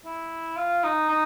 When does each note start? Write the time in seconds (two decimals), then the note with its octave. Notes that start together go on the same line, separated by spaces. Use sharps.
0.05 E4
0.57 F4
0.84 D#4
1.09 D#4